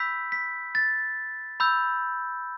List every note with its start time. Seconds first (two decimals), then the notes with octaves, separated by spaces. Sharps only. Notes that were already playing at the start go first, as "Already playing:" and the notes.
Already playing: B5 E6 G6 B6
0.32 B6
0.75 A6
1.60 B5 E6 G6